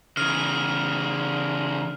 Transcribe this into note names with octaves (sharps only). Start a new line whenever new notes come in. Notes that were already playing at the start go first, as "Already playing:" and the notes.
C#3 E3 F6